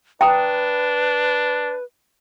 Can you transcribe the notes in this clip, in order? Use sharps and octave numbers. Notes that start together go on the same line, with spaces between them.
D4 B4 G5 A#5 D#6